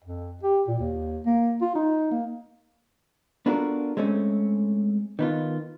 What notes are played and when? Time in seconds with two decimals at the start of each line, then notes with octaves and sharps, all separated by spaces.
0.04 F2
0.43 G4
0.67 A#2
0.79 D#2
1.26 A#3
1.61 F4
1.75 D#4
2.11 A#3
3.46 B3 D4 F4 F#4 A4 A#4
3.97 G#3 A3 C4 C#4
5.19 D#3 B3 F4